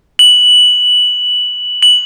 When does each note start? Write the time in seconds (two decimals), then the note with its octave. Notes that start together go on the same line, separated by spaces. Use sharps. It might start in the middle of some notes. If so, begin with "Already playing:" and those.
0.19 F#7
1.83 F#7